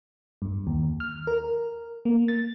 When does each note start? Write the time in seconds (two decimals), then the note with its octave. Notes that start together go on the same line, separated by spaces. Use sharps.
0.42 G2
0.67 D#2
1.00 F6
1.27 A#4
2.05 A#3
2.28 A6